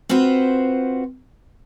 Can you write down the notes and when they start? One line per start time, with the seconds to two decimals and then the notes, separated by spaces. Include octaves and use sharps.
0.09 C4 F4 F#4 B4 C5